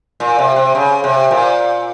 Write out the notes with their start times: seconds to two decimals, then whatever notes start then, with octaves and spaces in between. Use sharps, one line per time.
0.20 A#2
0.39 C3
0.56 C3
0.75 C#3
1.04 C3
1.31 A#2